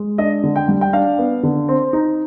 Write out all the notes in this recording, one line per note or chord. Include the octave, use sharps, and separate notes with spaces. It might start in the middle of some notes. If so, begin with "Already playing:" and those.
Already playing: G#3
D4 D#5
D3
G5
G3
G5
D4 F5
B3
D3
C4
D#4